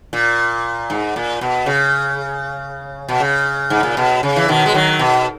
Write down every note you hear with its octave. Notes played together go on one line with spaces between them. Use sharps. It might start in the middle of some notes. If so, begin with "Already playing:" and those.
A#2
G#2
A#2
B2
C#3
B2
C#3
G#2
A#2
B2
C#3
E3
B2 D#3
G#3
D#3 F#3
B2